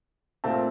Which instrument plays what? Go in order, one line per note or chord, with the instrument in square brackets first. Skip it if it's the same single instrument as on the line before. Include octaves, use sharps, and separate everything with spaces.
[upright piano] A#2 A3 C4 F5 A5